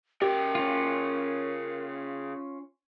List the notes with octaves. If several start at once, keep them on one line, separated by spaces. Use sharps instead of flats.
C#3 G4 A#4 G5
C#4 F4